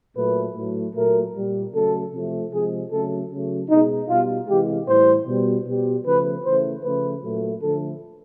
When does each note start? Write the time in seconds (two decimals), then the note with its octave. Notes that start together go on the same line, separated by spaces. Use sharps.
0.16 A#2 F#3 A3 B4
0.55 A2 F#3 A3
0.94 A#2 F#3 A3 A#4
1.34 A#2 G3
1.72 C#3 F#3 A3 A4
2.12 C3 F3 A3
2.51 C3 F3 G#3 G#4
2.90 C#3 F#3 A3 A4
3.30 C#3 F#3 A3
3.69 B2 G#3 D#4
4.08 B2 G3 F4
4.47 C3 E3 G#3 G4
4.86 A2 E3 G3 C5
5.26 B2 G3
5.65 B2 G3
6.04 C#3 F3 A3 B4
6.43 C#3 E3 A3 C5
6.83 C#3 F3 A3 B4
7.22 A#2 F#3 A3
7.61 D3 F3 A3 A4